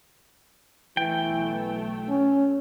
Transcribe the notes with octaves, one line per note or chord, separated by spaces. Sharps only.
B1 E3 A3 G5
C#4